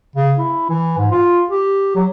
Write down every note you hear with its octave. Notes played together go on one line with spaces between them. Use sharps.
C#3
E4
E3
G#2
F4
G4
F#3